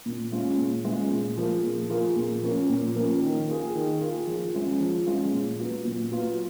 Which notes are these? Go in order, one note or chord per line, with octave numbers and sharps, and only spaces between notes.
A#2
G#3 C#4 F4
A#2
G#3 C#4 F4
A#2
F3 A#3 F4 G#4
A#2
F3 A#3 F4 G#4
A#2
F3 A#3 C#4
A#2
F3 A#3 C#4
D#3
A#3 F4 G#4
D#3
A#3 F4 G#4
F3
G#3 C#4 F4
F3
G#3 C#4 F4
A#2
F#3 B3 F4
A#2
F#3 B3 F4